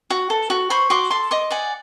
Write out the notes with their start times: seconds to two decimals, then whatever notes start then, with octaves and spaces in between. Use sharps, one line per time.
0.10 F#4
0.30 A4
0.50 F#4
0.70 C5 B5 C#6
0.90 F#4 C6 D6
1.10 A4 C6 D6
1.31 D#5 C6 D6
1.51 D5 F#5 G#5